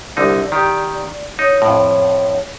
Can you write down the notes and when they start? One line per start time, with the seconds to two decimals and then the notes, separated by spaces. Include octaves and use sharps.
0.17 C2 D3 D#4 D5
0.52 D#3 G4 D5
1.39 D#4 C#5
1.62 F2 A2